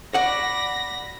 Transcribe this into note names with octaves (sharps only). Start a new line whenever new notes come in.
F#4 D5 F#5 B5 A#6